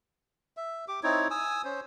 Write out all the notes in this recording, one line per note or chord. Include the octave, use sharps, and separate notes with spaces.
E5
G4 D6
C4 D#4 E4 C#5
G#5 D#6 E6
C#4 C5